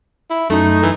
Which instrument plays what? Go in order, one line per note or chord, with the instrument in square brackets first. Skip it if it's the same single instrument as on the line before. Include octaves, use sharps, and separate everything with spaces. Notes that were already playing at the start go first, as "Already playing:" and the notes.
[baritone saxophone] E4
[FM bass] F#2 [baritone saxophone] A3 [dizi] D#4
[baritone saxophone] E3